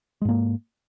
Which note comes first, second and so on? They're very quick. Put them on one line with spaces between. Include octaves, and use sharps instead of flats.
G#3 G#2 A#3